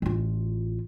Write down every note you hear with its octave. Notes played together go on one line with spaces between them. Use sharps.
A1 F4